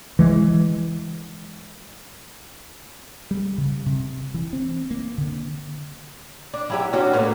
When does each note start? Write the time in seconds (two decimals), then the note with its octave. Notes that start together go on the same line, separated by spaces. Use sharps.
0.19 E3 G#3
3.31 G3
3.58 C#3
3.86 C3
4.34 E3
4.53 C4
4.91 A#3
5.18 D3
6.54 D4
6.70 F#3 E4 G4
6.93 C#4 D4 F#4
7.13 A2 A#3 B3